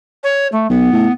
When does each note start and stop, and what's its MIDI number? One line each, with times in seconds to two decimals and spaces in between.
0.23 0.47 73
0.52 0.67 57
0.70 0.91 35
0.70 1.12 59
0.93 1.08 45